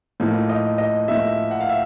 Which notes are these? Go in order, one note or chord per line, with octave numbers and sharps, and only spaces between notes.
A2 F3 A#3 D#4
D#5
D#5
A2 F3 A#3 D#4 E5
F#5
F5
E5